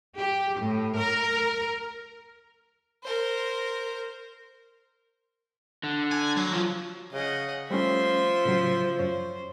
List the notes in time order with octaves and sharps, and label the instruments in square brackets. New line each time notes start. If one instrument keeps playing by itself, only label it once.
[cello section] G4
A2
A#4
[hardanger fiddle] A#4 C5
[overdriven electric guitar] D3
[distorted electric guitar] G#5
F#3
[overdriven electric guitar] F3 F4
[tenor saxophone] C#3 [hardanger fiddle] D#5 F#5
[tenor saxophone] F3 [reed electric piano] G3 A3 C#4 [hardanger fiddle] E5 C6
[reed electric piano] A2 C#3 F#3
[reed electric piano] F#2 C#5 [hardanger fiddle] C5